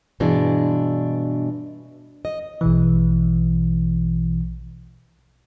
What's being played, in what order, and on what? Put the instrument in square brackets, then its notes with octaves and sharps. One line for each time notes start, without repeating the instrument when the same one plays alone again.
[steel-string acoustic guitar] G2 B2 E3 G#3 D4
D#5
[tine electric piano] A#1 B2 E3